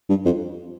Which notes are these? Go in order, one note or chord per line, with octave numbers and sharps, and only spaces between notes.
G2
F2